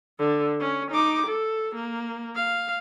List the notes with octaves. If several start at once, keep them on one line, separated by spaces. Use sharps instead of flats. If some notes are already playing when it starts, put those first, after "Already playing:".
D3
C#4
D#4 D6
A4
A#3
F5